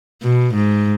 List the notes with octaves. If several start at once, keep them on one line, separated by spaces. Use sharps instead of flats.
B2
G#2